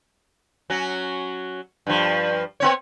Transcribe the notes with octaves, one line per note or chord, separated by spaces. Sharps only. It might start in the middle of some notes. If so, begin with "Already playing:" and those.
F#3 C#4 F#4
G2 F3
B3 C4 C#5